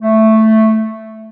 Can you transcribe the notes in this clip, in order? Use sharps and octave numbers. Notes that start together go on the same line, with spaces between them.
A3